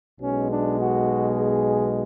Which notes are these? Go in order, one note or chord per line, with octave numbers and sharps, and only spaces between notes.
B1 B2 G#3 C#4
D4
F#4
G#4